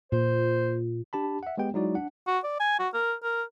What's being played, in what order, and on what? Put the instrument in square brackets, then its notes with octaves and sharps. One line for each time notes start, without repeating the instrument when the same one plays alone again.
[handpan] A#2 [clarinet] C5
[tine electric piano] D4 G4 A5 B5
E5 F#5
G#3 B3 G4 G5
F#3 G#3 D#4 E4 F#4 D5
D4 F#5
[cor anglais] F#4
D5
G#5
F#4
A#4
A#4